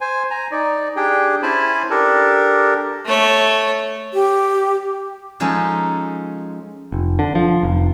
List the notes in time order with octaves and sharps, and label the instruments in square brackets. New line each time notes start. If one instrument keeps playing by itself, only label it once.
[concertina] C5 G#5
G#5 A#5
D#4 D5
D4 G4 G#4 G5
C#4 E4 C5 G#5 A5 B5
D4 G4 A4 A#4
[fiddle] A3 C#5
[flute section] G4
[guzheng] F3 G#3 C#4 D#4 G#4 A4
[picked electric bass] F1
D3
F3
F1